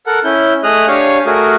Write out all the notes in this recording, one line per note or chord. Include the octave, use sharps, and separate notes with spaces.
A4 A#4 F#5
C#4 E4 G6
A3 G#4 D#5 D#6 F6 F#6
D4 G4 C#5 F5 G#5 C#6
A3 F#4 G#4 A#4